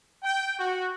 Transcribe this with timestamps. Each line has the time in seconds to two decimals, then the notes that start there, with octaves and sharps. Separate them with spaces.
0.22 G5
0.58 F#4